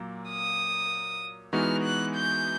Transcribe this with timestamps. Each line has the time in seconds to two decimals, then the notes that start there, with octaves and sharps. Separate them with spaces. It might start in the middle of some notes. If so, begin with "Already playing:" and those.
Already playing: A#2 F#3 A#3
0.30 D#6
1.53 E3 G#3 B3 D#4 F#4 F6
1.83 F#6
2.15 G6